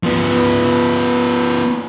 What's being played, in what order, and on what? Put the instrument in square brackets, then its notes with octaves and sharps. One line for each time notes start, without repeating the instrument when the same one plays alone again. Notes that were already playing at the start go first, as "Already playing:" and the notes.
[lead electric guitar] F3 B3